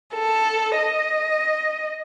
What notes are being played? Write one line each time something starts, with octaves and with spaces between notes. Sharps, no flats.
A4
D#5